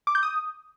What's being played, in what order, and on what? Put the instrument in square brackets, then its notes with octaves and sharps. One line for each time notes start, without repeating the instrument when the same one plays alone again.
[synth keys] D6
G6
D#6